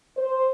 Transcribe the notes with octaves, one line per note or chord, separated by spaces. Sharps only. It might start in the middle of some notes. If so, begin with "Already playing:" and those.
C5